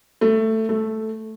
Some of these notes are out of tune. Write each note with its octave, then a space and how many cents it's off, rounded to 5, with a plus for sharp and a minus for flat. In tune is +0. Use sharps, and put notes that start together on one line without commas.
A3 +10
A3 -5